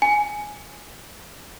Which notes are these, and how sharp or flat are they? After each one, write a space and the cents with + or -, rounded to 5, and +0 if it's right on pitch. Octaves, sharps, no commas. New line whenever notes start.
G#5 +5